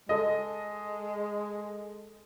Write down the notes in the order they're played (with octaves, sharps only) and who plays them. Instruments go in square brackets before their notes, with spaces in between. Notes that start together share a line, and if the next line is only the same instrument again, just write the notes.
[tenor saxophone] G#3 [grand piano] A4 D#5